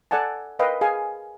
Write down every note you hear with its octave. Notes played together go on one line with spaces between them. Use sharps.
A4 D5 F#5 G#5 A5
A#4 B4 D#5 F5 G5
G#4 F5 G#5